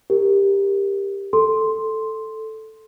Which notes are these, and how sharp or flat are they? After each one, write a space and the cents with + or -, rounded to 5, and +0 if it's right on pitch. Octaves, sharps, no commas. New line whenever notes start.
G4 +15 A#4 +0
A4 +0 C6 +0